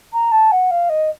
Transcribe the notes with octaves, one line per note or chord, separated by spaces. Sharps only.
A#5
A5
F#5
F5
D#5